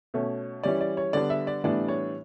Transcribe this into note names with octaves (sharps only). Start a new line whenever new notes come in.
B2 A3 C#4
E3 G3 C#4 D5
D5
C#5
D3 G3 B3 D4 D5
E5
D5
A2 E3 G3 B3 D4 D5
C#5